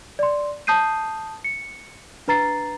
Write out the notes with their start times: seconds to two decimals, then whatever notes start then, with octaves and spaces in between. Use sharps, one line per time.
0.19 D5 C6
0.67 A5 D#6 G6 C7 D#7
1.44 C#7
2.28 D4 B4 A#5 A6 C7